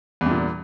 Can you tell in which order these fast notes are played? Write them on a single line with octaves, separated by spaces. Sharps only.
E2 G2 A#2